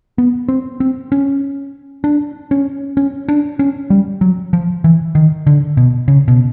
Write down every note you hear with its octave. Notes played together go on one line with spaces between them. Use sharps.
B3
C4
C4
C#4
D4
C#4
C#4
D4
C#4
G3
F#3
F3
E3
D#3
D3
B2
C#3
B2